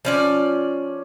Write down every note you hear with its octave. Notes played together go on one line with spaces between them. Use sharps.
F3 C#4 D5